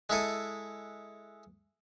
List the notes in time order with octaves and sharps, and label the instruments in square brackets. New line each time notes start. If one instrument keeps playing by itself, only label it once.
[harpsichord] G#3 E4 A4 D#6